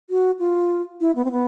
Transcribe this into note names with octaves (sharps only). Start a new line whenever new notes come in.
F#4
F4
E4
B3
C4
B3